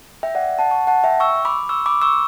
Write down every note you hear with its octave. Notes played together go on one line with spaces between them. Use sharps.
E5 G5
D5 F#5
F#5 A5
A5 C#6
F#5 A5
E5 G5
C#6 E6
B5 D6
C#6 E6
B5 D6
C#6 E6